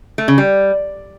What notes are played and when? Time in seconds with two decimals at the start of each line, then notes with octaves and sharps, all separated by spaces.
0.18 A3
0.28 C#3
0.38 G3